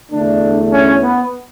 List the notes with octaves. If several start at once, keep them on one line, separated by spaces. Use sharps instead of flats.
E2 D3 A3 D4
C#4
B3